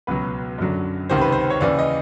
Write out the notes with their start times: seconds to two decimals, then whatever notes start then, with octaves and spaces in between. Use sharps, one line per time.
0.07 C#2 B2 F#3 B4
0.58 F#2 D3 F#3
1.10 C#2 C3 D#3 C5
1.21 B4
1.32 C5
1.50 C#5
1.61 D#2 C#3 E3 D5
1.79 D#5